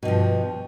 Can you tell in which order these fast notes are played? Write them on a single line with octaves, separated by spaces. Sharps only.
B2 G2 F3